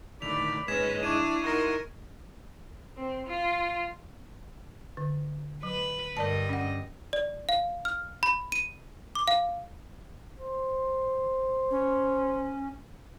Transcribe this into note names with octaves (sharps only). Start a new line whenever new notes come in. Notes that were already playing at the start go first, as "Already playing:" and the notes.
A2 D3 D#3 D5 B5 F7
G#2 G#3 C#4 B4 D#5 G#6 B6 E7
D4 E4 C#6 G#6 D#7
D#4 F#4 A#4 C6 C#6 A#6
C4
F4
D3
F#3 B4
G2 D3 A#4 D5 D#5 A5
C#4 F#5
D5
F5
F6
B5
D#7
D6
F5
C5
C#4